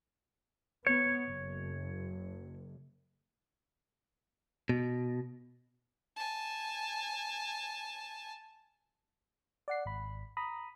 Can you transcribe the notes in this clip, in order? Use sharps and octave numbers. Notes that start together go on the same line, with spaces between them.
B3 C#5
F#1
B2
G#5 A5
D5 F#5 C7
G#1 B5
A#5 B5 D#6